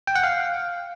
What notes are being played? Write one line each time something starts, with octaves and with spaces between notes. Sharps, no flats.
G5
F#5
F5